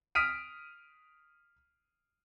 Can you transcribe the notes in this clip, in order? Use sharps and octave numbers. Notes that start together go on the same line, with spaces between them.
D#6 F6 B6 D7 D#7